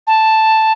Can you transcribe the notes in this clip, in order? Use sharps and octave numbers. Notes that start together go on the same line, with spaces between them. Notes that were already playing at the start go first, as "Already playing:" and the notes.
A5